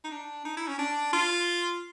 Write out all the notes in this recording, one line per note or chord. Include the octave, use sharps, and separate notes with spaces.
D#4
D4
D#4
E4
C#4
D4
F4